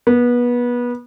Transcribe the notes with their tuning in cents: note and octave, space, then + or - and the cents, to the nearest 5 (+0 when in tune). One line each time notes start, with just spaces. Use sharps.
B3 -25